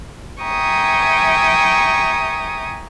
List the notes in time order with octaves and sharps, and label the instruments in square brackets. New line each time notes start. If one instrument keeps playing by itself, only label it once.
[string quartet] E5 G5 G#5 A#5 C#6 D#6